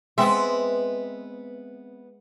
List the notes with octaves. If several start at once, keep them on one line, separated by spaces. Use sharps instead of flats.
G#3 B3 C4 E5